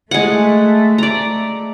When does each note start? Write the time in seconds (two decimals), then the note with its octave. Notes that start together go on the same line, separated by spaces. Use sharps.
0.11 G#3 A3 F#5
0.98 D5 A#5